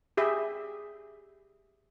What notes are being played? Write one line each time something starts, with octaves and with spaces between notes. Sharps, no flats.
G4 G#4 E5